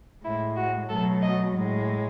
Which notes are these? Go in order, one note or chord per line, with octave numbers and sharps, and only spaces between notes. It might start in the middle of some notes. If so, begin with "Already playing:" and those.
A2 G#3 E4
F#4
B2 F#3 A3 A4
D#5
A2 G#3